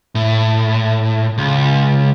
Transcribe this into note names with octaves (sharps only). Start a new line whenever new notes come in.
A2
C#2